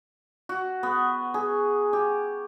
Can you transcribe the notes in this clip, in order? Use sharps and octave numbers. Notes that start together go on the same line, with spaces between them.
F#4
B3
G#4
G4